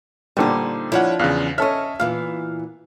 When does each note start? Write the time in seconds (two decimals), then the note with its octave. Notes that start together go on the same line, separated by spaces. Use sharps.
0.37 A#2 D3 G3 D#4 C5
0.92 F3 D4 E4 C#5 F#5
1.19 E2 C#3 F5 F#6
1.58 C#4 A4 C#5 D#5 E5 F6
2.00 A#2 E3 B3 F5